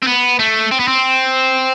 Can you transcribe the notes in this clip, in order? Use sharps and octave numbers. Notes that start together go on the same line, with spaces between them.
C4
B3
A3
C4
B3
C4